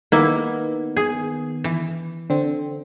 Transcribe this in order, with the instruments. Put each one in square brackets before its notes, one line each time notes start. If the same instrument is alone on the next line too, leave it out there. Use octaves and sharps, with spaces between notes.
[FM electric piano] D#3 B3 [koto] A#3 E4
[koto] G#4
E3
[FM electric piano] D3 C4